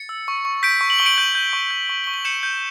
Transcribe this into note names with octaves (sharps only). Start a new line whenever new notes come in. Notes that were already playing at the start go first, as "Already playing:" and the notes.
Already playing: A6 C#7
E6
C#6
C#6
G6 B6 D7
C#6
F#7
C#6 G7
D7 F#7
G6 D7 F#7
G6
C#6
G6
C#6
C#6 G7
F#7
G6 C#7 E7
G6